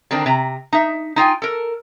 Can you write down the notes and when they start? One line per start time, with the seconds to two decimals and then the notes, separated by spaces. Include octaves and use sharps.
0.11 D3 D#3 C4 D4 A#4
0.26 C3 A#5
0.73 D#4 E5
1.16 D#4 F4 G5 G#5
1.42 A4 A#4